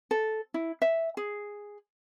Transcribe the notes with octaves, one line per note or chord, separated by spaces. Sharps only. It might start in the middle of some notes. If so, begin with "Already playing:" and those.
A4
E4
E5
G#4